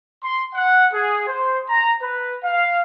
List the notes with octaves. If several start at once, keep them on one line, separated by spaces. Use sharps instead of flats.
C6
F#5
G#4
C5
A#5
B4
F5